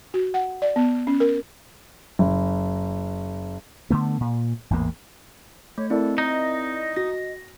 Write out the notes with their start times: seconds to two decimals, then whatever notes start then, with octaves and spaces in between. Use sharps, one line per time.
0.14 F#4
0.34 F#5
0.62 D5
0.76 B3
1.07 C#4
1.20 A#4
2.19 F#1
3.90 D3 A3 B3
4.21 A#2
4.70 A1 E2 G#2 A#3
5.78 A3 C#5
5.90 C4 E4 A4 A#4 D5
6.18 D#4 D#5
6.96 F#4 A#6